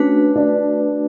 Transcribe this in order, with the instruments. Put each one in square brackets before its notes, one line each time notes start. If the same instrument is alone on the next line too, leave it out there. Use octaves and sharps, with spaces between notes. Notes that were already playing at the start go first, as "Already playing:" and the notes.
Already playing: [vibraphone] A3 D4 F#4 B4 [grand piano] C#4
[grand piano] D4